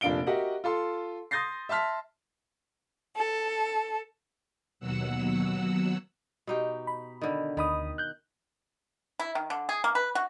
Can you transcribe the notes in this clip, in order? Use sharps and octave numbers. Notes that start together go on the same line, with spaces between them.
F1 A#2 D4 F5 D7 G7
F#4 G4 A#4 D#5 E5 F#5
F4 A4 C6
C6 D#6 G6 A6 A#6 C7
E5 A5 C6 F6 B6
A4
D#2 B2 F#3 F#5 E6
B2 D#4 G4
B5
D3 D#3
D2 D#3 B5 D#6
F#6 G6
E4
D#3
D3
G#4
A#3
B4
F#4